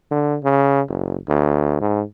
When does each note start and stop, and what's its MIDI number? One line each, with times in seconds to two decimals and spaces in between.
0.11 0.38 50
0.44 0.81 49
0.89 1.16 30
1.28 1.80 38
1.81 2.02 44